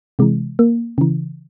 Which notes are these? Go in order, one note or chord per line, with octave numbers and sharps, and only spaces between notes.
C3 E3 G#3
A#3
C#3 E3